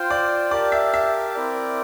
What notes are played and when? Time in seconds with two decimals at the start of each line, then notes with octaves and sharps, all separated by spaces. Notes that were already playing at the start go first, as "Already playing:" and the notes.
Already playing: F4 C5 G5
0.10 D5
0.51 G4 A#4 D5 F5 A5
0.72 E5
0.94 E5
1.35 C4 E4 A#4 D5